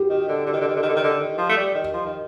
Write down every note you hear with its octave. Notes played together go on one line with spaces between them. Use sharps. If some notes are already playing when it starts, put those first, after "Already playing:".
Already playing: G4
D#3
D3
D3
D#3
D3
D#3
D3
D#3
D3
D#3
D3
D#3
F3
A3
G3
D#3
F3
D#3